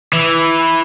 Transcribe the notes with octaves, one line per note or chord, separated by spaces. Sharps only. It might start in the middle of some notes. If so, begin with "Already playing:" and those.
E3